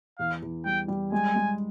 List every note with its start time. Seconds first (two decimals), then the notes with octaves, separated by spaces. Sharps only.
0.19 E2 F5
0.42 E2
0.66 G3 G5
0.88 G3
1.12 G#3 G#5
1.35 G#3